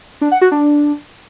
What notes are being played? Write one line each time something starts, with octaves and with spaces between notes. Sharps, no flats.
D4
F#5
F#4
D4